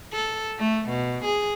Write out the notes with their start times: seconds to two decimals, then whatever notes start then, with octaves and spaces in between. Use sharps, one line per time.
0.13 A4
0.59 A3
0.89 B2
1.25 G#4